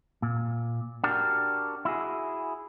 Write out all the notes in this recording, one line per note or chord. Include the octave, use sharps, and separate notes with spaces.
A#2
D4 F#4 G4 A#4
E4 F#4 G#4